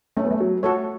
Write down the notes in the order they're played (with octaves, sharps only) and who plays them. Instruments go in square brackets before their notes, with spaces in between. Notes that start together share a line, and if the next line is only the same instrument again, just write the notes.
[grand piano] A3 [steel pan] C#4
[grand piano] B3
A3
F#3
[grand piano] A3 [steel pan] F#4 A4 C#5